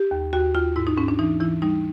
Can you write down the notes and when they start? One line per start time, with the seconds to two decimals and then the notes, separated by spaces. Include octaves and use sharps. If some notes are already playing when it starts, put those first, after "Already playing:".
Already playing: G4
0.11 D#2
0.33 D#2 F#4
0.55 D#2 F4
0.76 G#2 E4
0.87 D#4
0.98 G#2 C#4
1.08 D4
1.19 E3 D#4
1.40 E3 E4
1.62 G3 D#4